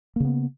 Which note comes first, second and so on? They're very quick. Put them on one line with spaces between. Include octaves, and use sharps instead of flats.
A#3 C#3 B3